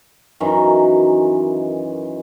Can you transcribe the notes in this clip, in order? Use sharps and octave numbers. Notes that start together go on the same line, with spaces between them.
F#2 D#3 E3